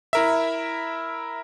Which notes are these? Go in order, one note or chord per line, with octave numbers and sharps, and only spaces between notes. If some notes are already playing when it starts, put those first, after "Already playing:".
E4 A#4 E5